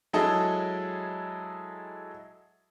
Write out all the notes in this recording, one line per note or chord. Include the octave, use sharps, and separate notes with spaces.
F#3 G#3 E4 G#4 A4 D#5